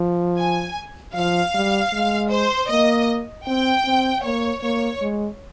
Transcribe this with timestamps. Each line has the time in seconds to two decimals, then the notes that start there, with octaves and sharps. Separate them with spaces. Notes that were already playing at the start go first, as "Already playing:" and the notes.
Already playing: F3
0.38 G#5
1.15 F3 F5
1.54 G3
1.93 G#3
2.31 C5
2.69 A#3 D#5
3.47 C4 G5
3.85 C4
4.24 A#3 C#5
4.62 A#3 C#5
5.01 G#3